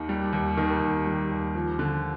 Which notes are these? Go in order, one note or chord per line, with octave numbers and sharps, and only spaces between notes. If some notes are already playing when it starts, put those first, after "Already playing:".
Already playing: D#2 D#3
G3
D#2
D#3
D#2
G3
D#2
F3
D3